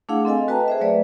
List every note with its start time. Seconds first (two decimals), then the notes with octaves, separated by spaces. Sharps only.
0.09 A3 D4 E4 G#4 F5 F#5
0.25 C4 A4 D#5 F5 G#5
0.48 F#4 B4 D#5 G5 A5 A#5
0.68 G#4 C5 E5
0.80 F#3 A3 B4 D5